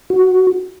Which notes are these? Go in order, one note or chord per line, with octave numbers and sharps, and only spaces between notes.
F#4